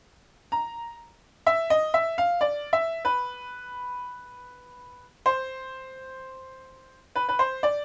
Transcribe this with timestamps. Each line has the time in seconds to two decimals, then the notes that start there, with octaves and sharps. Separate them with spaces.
0.52 A#5
1.47 E5
1.70 D#5
1.94 E5
2.18 F5
2.41 D5
2.73 E5
3.05 B4
5.26 C5
7.16 B4
7.29 B4
7.39 C5
7.63 D5